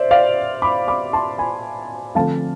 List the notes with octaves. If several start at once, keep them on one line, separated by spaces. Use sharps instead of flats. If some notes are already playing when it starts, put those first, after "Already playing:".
Already playing: C5 D5 E5
D5 F5
B5 D6
B5 D6
A5 C6
G#5 B5
D3 F3 A3 C4 F5 A5